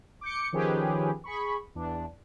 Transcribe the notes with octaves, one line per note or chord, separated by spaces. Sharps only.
D6 G6 C#7
D#3 F3 C#4 G4 G#4 B4
G#4 B5 C#6
E2 D4